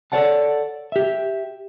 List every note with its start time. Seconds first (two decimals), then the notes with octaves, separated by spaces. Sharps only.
0.12 A4 B4 C#5 D5 F#5 A5
0.92 G4 E5